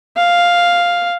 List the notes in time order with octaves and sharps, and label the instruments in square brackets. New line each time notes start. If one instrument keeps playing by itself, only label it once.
[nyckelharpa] F5